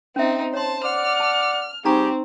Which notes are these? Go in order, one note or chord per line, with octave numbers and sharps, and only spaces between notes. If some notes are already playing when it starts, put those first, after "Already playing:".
C4 C#4 D#4 E5
C5 C#5 A5 C6
D5 F#5 D6 F6
A5
G3 C4 D#4 G4 G#4 A#5 C#6